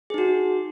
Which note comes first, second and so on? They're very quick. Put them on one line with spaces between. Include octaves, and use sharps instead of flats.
G#4 D#4 F#4